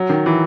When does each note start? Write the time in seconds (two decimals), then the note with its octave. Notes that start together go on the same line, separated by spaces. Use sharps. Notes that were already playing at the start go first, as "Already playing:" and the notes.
Already playing: F#3
0.10 D#3
0.26 E3